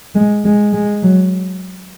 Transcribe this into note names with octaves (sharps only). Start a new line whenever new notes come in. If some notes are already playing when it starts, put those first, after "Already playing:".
G#3
G#3
G#3
F#3